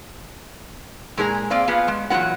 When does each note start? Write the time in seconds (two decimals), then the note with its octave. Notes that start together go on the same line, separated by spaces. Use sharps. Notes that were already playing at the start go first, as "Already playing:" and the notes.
1.17 A#2 G#3 G#4 A#4 A#5
1.50 A#3 C4 D5 F5
1.68 A#3 B3 F4 G#4 F5
1.88 G#3
2.10 E2 A#2 E3 F#3 B3 F#5